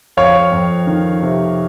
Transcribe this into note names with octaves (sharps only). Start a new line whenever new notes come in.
F2 C#5 F5
F2
D#3
C3